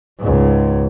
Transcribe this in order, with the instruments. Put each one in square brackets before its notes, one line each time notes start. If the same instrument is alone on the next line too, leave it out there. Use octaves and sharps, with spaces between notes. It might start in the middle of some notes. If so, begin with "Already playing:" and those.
[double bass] C#2 G#2